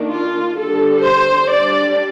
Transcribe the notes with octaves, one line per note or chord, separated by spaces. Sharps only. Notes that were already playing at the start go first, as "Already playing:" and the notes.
Already playing: D#3 A#3 D4
F4
D3 G3 D4 A4
C5
G3 D4 D5